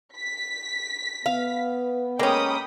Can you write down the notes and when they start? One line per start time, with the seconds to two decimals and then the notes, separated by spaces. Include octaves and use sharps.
0.16 B6
1.26 B3 F5
2.19 G#3 A#3 C#4 G5 B5 D#6